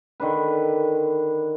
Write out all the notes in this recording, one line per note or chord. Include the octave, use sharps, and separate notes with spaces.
D3 D#3 D4 B4